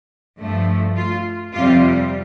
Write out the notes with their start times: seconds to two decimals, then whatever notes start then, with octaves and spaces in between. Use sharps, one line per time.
0.38 G2 F3 A3
0.95 F4
1.53 F2 C3 G3 F4